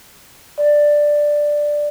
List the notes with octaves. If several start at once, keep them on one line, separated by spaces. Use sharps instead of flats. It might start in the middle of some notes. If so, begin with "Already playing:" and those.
D5